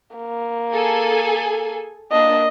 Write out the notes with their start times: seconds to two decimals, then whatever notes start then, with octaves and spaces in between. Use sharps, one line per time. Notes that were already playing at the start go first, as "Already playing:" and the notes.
0.16 A#3
0.74 G#4 A4 G#5
2.12 A#3 D4 D#5